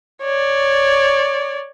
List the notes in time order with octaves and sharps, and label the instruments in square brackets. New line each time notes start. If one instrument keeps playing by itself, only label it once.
[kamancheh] C#5 D5